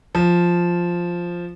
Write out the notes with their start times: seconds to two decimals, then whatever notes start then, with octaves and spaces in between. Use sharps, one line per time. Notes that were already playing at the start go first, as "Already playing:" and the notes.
0.15 F3